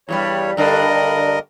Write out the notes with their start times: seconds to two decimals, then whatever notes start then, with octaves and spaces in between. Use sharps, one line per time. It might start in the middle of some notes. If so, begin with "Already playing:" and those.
0.09 E2 G2 G3 C#5
0.57 G2 D3 D4 A#4 D#5